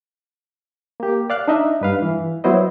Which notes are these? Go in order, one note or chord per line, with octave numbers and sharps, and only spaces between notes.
A#3 G4
D5 F5 F#6
D4 D#4 D#5 E5
G2 B4 F5
E3
F#3 B3 E4 C5 D#5